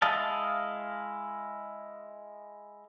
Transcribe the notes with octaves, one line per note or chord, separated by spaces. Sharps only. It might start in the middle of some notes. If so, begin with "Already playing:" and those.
G#3 E4 D#5 F5 A5